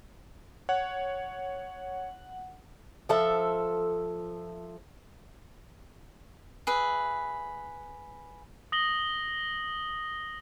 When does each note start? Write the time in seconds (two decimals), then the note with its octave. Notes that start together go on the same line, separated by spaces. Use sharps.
0.69 C#5 F#5
3.09 F3 A4 E5
6.67 G#4 B4 E5
8.72 D#6 A#6 F#7 G7